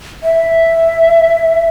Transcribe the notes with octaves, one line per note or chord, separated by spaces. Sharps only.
E5